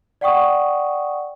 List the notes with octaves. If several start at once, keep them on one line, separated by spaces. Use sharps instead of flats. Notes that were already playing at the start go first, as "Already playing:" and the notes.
D5 F#5 G5 C#6 D#6